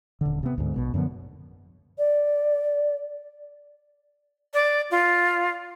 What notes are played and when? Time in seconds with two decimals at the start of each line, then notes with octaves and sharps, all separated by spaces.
0.21 D#1 D3
0.43 C3 B3
0.58 D2 G#2
0.76 A#1 B2
0.94 F#2 D3 F3 B3
1.97 D5
4.54 D5
4.91 F4